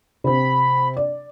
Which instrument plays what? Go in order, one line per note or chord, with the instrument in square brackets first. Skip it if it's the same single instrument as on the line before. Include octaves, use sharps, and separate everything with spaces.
[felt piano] C3 C4 [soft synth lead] B5
[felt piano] D5